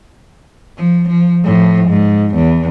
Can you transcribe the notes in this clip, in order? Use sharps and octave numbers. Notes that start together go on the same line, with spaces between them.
F3
F3
A2 F3
G#2
E2